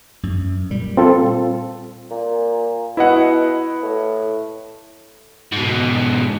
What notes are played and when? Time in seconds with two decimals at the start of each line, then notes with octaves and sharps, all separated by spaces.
0.23 F#2
0.70 A#2 G3
0.97 C4 F4 A4
2.10 A#2
2.97 B2 E4 D#5 F#5
3.83 A2
5.52 G#2 B2